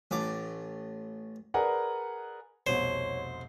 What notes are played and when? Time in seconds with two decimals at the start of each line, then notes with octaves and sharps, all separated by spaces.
0.11 A1 A2 D6
1.54 G#4 A#4 B4 D5 F#5 G#5
2.67 F1 C2 B2 C5 C#5